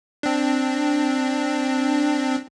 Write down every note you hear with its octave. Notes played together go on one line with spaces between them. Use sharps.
C4 D4